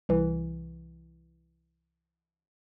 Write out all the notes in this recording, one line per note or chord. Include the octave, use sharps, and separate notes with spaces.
C2 E3